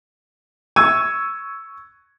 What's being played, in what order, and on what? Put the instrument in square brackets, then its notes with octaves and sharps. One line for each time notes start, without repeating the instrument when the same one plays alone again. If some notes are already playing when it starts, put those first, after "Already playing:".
[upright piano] C#6 E6 G#6 D#7